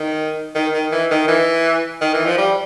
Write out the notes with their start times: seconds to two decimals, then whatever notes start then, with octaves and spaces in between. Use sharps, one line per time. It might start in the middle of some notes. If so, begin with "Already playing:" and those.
Already playing: D#3
0.55 D#3
0.74 D#3
0.92 E3
1.11 D#3
1.28 E3
2.02 D#3
2.14 E3
2.26 F3
2.38 G3